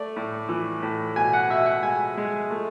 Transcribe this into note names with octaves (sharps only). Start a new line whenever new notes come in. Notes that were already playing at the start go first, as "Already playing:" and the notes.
Already playing: A3 D5
A2
E3
A2
B2 G#5
F#5
B2 E5
F#5
G#3 G#5
G#3
A3